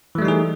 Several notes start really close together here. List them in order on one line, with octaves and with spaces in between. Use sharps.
E3 A3 G3 D#4 G#4